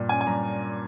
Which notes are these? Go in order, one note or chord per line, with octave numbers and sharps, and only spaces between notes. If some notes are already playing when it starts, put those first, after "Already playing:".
Already playing: G2 A#2
C#4 G#5
G#5
G2 A#5